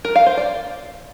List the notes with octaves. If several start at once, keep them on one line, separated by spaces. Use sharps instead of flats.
A#4
F5
C5
D5